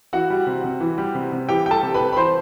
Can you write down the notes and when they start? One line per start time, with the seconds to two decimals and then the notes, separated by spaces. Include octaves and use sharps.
0.13 E3 F#4 F#5
0.30 G3
0.47 C3
0.64 C3
0.80 E3
0.98 G3
1.15 C3
1.32 C3
1.49 E3 G4 G5
1.66 G3 A4 G5 A5
1.83 C3
1.94 B4 B5
2.00 C3
2.12 B5
2.16 E3 C5 C6